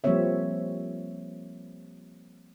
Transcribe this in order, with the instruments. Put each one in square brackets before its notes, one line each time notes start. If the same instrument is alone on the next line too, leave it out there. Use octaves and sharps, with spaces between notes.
[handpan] F3 G3 A#3 C4 C#5 E5